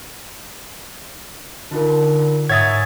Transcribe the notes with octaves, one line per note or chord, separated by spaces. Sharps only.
D3 D#4 F4 A#4
G#2 C#5 E5 F#5 G#5 D#6 G#6 A6